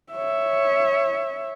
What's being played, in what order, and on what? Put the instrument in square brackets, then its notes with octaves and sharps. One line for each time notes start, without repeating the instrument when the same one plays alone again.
[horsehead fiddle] C#5 E5